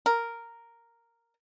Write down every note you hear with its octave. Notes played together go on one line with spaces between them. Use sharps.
A#4